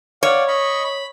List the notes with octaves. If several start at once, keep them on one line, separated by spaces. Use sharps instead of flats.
C#5 D5 F5 F#5
D#5 B5 C#6
B5